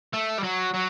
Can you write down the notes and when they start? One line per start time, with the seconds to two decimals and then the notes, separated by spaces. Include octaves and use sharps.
0.14 A3
0.39 G3
0.44 F#3
0.74 F#3